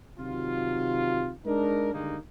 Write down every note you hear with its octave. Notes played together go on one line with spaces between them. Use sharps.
C3 D#3 F#3 F4
G#3 D4 D#4 A#4
D3 D#3 G3 G#3 A#3 D#4